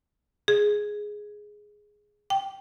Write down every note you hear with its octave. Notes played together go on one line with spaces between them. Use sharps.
G#4
G5